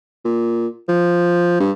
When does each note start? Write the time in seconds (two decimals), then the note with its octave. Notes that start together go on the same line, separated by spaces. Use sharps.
0.25 A#2
0.89 F3
1.60 G2